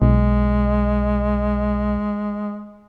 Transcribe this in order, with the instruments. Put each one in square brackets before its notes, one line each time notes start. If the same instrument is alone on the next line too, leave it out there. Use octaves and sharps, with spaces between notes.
[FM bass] B1 [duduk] G#3